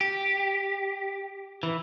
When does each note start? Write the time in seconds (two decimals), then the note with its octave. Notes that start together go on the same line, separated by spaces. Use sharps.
0.01 G4
1.63 E3